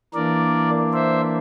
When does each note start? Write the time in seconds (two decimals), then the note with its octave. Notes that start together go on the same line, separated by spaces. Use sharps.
0.14 E3 A#3 D4 A#4 D5
0.93 C5 E5